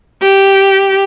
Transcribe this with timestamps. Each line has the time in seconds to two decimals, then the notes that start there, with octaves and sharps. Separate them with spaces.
0.22 G4